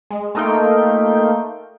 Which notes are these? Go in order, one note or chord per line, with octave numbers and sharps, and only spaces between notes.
G#3
A3 A#3 D#4 F4 G5